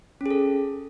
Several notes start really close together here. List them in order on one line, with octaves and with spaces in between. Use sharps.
C#4 G#4 A4